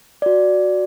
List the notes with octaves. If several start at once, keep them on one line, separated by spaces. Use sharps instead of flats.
F#4 D5